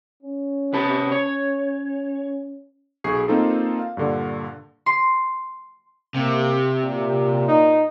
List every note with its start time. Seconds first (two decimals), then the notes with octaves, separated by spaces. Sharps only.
0.23 C#4
0.73 C3 B4 A5
1.11 C#5
3.04 B1 G#4 C#6 C7
3.28 A#3 C4 D#4 F4 A4
3.79 F5
3.97 G2 A#2 D3
4.86 C6
6.15 C3 A#3
6.83 A#2
7.48 D#4